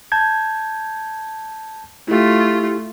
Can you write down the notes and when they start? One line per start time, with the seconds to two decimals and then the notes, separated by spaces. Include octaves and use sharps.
0.12 A5 G6 G#6
2.08 A3 E4 F4 G4